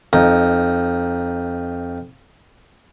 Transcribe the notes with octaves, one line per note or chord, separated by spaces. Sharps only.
F2 D#4